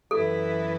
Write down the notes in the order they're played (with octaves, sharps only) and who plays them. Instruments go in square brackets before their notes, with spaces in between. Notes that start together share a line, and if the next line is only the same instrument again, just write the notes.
[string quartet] F#2 E3 B3 E4 B4 [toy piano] A4